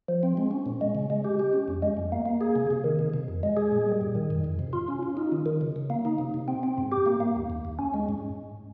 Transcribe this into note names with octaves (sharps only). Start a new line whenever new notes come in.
F3
C4
G#3
C#4
A#2
G#3
C#3
G#3
G4
G4
C#4
F2
G#3
F2
A#3
A#3
G#4
C3
C3
D#3
C3
C3
F2
G#3
G#4
A#2
G3
G#2
D#3
F2
F2
C3
F4
C#4
F4
D#4
D#3
D#3
C#3
C#3
A#3
D#4
C3
C3
C4
C4
G#2
G4
A#3
A#3
D#2
D#2
D#2
C#4
G#3
G#2